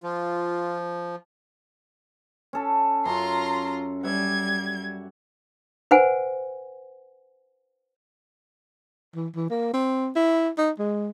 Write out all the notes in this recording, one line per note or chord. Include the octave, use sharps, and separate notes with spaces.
F3 F4
C#4 A4
F#2 C#4 F4 A#5 C6
G3 D5 E5 F#5 G#6
B4 C5 F#5 G#5
E3
E3
A#3
C4
E4
D#4
G#3